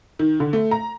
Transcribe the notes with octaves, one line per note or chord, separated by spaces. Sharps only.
D#3
D3
A3
A#5